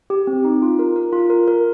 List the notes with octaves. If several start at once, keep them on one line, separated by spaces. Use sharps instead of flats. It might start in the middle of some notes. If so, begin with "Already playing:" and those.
G4
C4
D#4
F4
A#4
A#4
F4
A#4
A#4